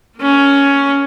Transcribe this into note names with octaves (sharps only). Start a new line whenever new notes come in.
A#3 C#4